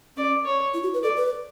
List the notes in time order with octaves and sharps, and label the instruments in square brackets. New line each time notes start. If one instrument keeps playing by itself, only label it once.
[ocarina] C#4 [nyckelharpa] D5
[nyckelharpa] C#5
[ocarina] E4
F#4
B4
[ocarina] A4 [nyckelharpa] D5
[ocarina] B4